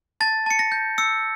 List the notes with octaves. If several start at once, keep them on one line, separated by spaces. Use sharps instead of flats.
A5 A6
A5 C#7
A#6
G6
E6 C#7